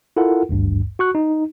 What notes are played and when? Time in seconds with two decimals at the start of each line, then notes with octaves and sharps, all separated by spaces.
0.16 E4 F4 A4 A#4 F#5
0.49 G#1 D2 G2
0.99 F#4 C#6 F#6
1.15 D#4